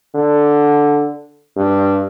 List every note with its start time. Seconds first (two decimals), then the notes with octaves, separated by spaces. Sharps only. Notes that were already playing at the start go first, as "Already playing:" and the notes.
0.15 D3
1.56 G2